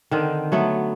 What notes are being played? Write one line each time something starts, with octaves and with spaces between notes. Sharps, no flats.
D3 D#3 C4
F#3 A3 B3